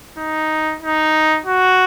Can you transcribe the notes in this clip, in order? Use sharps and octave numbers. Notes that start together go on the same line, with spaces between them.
D#4
D#4
F#4